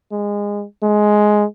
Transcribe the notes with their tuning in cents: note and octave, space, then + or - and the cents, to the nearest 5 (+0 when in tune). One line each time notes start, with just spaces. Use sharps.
G#3 -20
G#3 +10